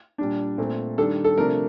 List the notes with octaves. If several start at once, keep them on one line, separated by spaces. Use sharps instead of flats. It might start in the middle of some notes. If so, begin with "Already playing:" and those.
A#2 G3 D4
A#2 A3 C4
D#3 G3 D4 A4
A4
C3 F3 A3 D4 A#4